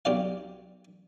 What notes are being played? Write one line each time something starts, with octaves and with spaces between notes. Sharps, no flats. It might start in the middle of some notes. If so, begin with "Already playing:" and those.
B1 G4 D5 F5